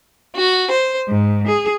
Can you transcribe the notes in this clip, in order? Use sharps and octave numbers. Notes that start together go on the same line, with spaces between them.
F#4
C5
G#2
G#4